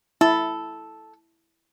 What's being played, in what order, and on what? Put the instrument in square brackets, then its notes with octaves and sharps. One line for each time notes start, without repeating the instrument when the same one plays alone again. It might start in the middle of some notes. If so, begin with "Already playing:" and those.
[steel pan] E4 [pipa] A4